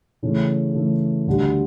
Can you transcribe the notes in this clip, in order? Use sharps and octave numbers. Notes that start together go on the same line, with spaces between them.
C#3 E3 A3 C#4
C#3 E3 A3 C#4
D2 D3 G3